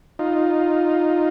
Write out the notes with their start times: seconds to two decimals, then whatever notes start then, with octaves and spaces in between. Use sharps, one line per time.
0.19 D#4 F4